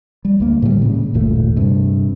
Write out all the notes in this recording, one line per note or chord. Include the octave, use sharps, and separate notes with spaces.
G3
D2 A#3
A2 D3 D#3 G3
A#2 C#3 G#3
G1 D#2 A#2 A3
G2 C3